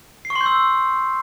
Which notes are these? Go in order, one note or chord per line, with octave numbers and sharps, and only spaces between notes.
C7
C#6
C6
G6
E6